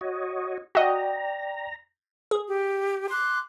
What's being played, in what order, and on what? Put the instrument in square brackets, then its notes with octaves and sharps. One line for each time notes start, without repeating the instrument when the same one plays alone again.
[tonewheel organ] F#4 C#5 D#5
[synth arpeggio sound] F#4 D#5 [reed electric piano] D5 G5 [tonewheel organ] A#5
[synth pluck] G#4
[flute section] G4
C6 D6 F#6